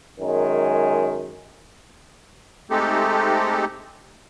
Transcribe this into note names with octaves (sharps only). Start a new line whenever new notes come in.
F#2 D#3 G#3
G#3 A3 C4 D#4 G4 A4